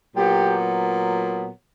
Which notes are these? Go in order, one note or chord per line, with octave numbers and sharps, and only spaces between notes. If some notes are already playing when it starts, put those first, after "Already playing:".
A#2 F#3 B3 G4